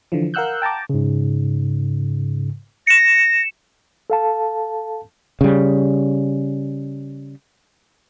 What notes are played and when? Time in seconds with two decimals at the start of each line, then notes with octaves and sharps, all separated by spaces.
0.12 D3 E3 F3
0.34 A#4 F5 F#5 E6 F#6 G6
0.62 G5 A5 A#5 D6
0.90 G#2 C#3
2.87 A#6 C#7 E7
4.10 A4 F5 A5
5.41 C#3 G3